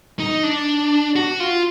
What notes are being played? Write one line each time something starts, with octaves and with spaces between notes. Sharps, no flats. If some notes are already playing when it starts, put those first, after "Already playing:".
D#4
D4
F#4
F4